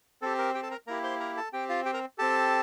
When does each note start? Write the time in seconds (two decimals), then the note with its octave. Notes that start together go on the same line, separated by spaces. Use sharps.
0.22 C4 G4 A4
0.38 A#4
0.55 G4 G5
0.63 A4 A5
0.71 A#4 A#5
0.87 A#3 E4 G4 A#4 A#5
1.03 C5 C6
1.20 A#4 A#5
1.37 A4 A5
1.53 C4 G4 G5
1.69 F4 F5
1.85 G4 G5
1.93 A#4 A#5
2.18 C4 G4 A4 A5